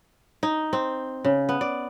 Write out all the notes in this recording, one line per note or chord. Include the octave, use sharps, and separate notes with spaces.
D#4
C4
C#3
B3
D5